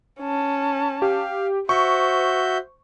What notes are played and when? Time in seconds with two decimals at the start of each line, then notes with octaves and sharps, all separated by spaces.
0.21 C#4 A5
1.02 G4 F5
1.69 F#4 C5 E5 C#6 G6